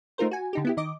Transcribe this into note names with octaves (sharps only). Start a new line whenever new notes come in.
A3 D#4 F4 A#4 C5
F#4 G#5
D3 D#4 G4
B3 E4 G4
D#3 D#5 D6